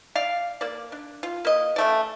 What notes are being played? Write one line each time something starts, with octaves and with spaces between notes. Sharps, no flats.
D5 F5
A#3 D5
D4
F4
A#3 D#5
C#3 A3 D5